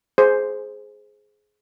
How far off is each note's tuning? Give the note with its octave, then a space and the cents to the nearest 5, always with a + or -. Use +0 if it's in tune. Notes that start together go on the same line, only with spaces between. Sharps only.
G#4 +15 C5 +0